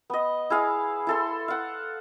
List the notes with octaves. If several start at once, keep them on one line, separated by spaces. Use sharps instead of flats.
B3 D#5
E4 G#4 F5
E4 A4 C6
F5 F#5